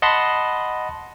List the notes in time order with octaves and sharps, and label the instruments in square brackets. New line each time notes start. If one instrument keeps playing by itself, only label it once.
[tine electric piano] D#5 F#5 A5 B5 C6